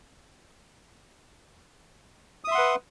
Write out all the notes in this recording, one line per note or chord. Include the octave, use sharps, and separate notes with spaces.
B4 E5 F#5 C6 D#6